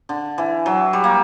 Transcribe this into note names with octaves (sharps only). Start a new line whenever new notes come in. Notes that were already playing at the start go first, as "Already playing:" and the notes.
D3
E3
F#3
G3
A#3